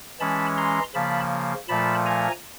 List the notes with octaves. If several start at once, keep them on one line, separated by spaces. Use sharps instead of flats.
E3 G#3 C#4 A5 B5
A#5 C6
C#3 F3 A#3 A5 B5
A#2 F3 A3 A5 B5
G#5 A#5